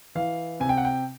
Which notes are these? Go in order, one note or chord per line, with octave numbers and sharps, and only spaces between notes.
E3 F5
C3 G#5
G5
F#5
G5